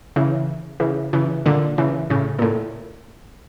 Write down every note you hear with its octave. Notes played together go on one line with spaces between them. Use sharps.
C#3 E3
C#3 E3
C#3 E3
A#2 D3
C#3 E3
A2 C#3
A#2
A2